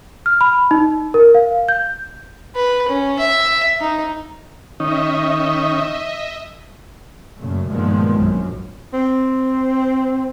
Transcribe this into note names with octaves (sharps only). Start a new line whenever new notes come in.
F6
B5
D#4
A#4
F5
G6
B4
C#4
E5
D#4
D#3 C#4 D#4 D#5 E5
F#2 A#2 C#3 A3
G2 A#2 D#3 F3 G#3 B3
A#1 F#2
C4